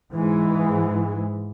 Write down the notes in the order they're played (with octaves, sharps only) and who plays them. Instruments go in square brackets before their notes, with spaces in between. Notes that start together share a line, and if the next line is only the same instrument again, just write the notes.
[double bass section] G#2 E3 G#3